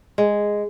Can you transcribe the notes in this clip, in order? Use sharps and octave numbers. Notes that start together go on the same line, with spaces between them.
G#3